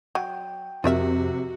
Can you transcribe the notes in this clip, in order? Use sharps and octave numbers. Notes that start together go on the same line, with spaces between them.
F#3 G5
F2 C3 F4 F#4 A#4 E5